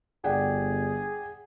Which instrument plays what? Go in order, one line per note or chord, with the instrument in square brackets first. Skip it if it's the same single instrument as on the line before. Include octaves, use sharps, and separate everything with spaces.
[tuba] G1 [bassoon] G#4 [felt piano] D5 F#5 G5